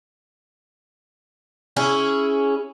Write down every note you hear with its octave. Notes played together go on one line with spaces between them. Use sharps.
C#4 E4 G#4